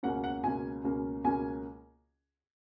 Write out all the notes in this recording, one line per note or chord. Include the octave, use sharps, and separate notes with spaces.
C#2 B2 A#3 C#4 F#5
F#5
C#2 B2 A#3 C#4 G#5
C#2 B2 A#3 C#4
C#2 B2 A#3 C#4 G#5